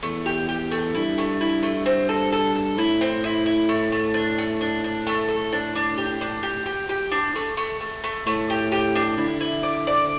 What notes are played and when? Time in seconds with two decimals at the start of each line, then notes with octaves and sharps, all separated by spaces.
0.03 E2 A3
0.26 G4
0.49 G4
0.72 A3
0.95 G2 E4
1.18 A3
1.41 E4
1.63 A3
1.86 C4
2.09 A4
2.32 A4
2.55 A4
2.77 A2 E4
3.01 C4
3.24 E4
3.46 E4
3.69 A3
3.92 A3
4.14 D4
4.38 A3
4.61 D4
4.84 D4
5.07 A3
5.29 A4
5.52 D4
5.75 D4
5.98 G4
6.21 D4
6.43 G4
6.66 G4
6.89 G4
7.11 D4
7.36 A3
7.57 A3
7.81 A3
8.04 A3
8.26 A2 A3
8.50 G4
8.72 G4
8.96 D4
9.17 D3 E4
9.41 E4
9.63 D5
9.87 D5